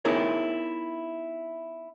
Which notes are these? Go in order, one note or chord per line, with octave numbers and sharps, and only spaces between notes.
B3 D#4 E4 G#4 A#4 C#5